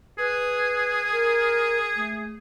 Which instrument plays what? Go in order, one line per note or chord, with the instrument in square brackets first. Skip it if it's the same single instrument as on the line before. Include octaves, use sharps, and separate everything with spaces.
[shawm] G#4 [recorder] B4
[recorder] A#4
A3